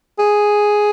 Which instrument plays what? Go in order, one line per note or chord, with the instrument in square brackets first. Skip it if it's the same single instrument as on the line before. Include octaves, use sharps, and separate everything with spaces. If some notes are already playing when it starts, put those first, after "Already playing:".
[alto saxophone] G#4